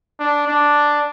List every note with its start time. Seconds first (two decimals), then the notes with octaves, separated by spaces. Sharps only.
0.20 D4
0.48 D4